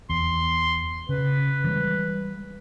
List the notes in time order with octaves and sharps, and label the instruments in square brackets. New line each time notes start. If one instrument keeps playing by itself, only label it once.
[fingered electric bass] E2 [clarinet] C6
[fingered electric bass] C#3 [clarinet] B4
[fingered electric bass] E3 G3 G#3